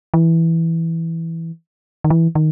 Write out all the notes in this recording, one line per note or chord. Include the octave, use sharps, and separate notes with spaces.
E3
D#3
E3
D#3